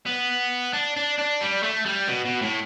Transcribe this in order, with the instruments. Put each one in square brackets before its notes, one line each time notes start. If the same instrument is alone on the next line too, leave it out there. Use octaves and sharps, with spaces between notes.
[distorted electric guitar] B3
D4
D4
D4
G3
A3
G3
B2
B2
A2